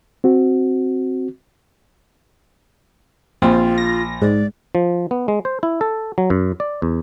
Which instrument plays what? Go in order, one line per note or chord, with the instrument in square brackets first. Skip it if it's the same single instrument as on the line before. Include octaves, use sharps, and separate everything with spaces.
[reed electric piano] C4 F#4
[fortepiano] A#1 [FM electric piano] C4 [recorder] F4
[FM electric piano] A#6
[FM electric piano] G#2 [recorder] D5
[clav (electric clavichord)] F3
B3
G#3
C5
E4
A4
F#3
F#2
D5
E2